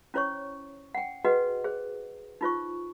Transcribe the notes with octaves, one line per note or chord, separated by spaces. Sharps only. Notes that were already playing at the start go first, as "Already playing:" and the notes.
C#4 E4 C5 C#5 C#6
F#5 G5
F#4 G#4 B4 D#5 F#5
G#4 C5
D#4 F4 C5 C#6